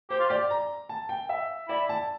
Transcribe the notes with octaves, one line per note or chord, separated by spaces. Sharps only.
G4 C5
F4
G4 D5
A#5
A5
G5
E5
E4 D5
A5